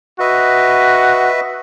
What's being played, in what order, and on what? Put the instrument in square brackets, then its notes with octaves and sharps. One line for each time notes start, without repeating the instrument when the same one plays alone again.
[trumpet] F#4 [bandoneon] B4 D#5 E5